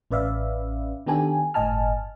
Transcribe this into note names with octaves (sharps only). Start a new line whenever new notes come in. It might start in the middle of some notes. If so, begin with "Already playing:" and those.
A1 C#4 B4 D5 E5 F5
D#3 B3 D4 G4 A4 G#5
G1 A2 D#5 G#5 A5 F6